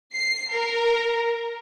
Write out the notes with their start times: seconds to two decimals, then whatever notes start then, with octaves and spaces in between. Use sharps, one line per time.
0.14 C7
0.52 A#4